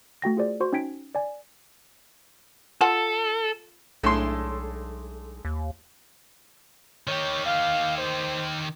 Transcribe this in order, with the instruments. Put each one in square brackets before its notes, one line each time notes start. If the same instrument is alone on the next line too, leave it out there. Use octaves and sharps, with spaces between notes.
[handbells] A3 F#4 G5 A#6
F4 G#4 C5 D5
F#4 C5 C6 C#6
C#4 D#4 G5 G#6 B6 D7
D5 G#5
[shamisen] F4 F#5 A5 [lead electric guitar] A4
[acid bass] B1 [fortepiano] A2 C6 [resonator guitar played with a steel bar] G#3 D4 A4
[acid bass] D#2
[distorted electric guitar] D#3 G4 [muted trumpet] C#5
[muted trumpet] F5
C5